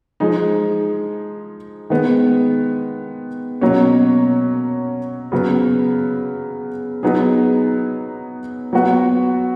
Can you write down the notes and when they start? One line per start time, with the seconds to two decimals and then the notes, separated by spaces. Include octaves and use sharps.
0.20 F3 G#3 D#4 G#4
1.90 D#3 G#3 B3
3.61 B2 F#3 A#3 C#4
5.32 C#3 F#3 B3
7.03 F#3 B3 D#4 G#4
8.73 F#3 B3 F#4